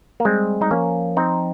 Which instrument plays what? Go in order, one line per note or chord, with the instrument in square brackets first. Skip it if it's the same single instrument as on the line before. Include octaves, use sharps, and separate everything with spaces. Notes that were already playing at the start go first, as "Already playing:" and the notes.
[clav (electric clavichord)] A#3
[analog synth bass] G3 [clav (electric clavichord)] G#3 C4
[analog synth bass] G3 [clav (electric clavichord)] D#4
[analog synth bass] F3 [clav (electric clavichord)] A#3 C#4
[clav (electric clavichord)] C4 D#4